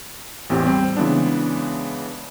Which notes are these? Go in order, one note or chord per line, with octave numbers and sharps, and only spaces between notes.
A1 E2 C4 G4
G3 C4
C#3 E3 G#3 B3 D4